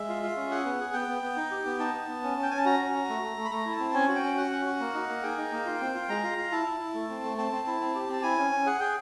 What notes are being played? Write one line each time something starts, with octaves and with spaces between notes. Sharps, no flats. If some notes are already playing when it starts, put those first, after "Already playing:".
Already playing: G#3 E5
F4
F4
C#4
G#4 F#5
B3
G#4
B3 G5
B3
B3
D#4
G4
B3
D#4 A5
B3
B3
C#4
C#4 G5
C#4 G#5
A5
F#4 A#5
C#4
F#4
A3
A3
A3
B5
A3 A#5
E4
A5
C4
C#4 G#5
F#4
G5
C#4
F#4 F#5
C#4
F#4
A#3
D#4
A#3
G#4 G5
D#4
A#3
F4
C4
F4
G#3 A#5
F4
F4
E4 A5
E4
E4
A3
C4
A3
C4 A5
C4
E4
C4
G4
C4 A5
E4 G#5
C#4
C#4
G#4 F#5
G#4 G5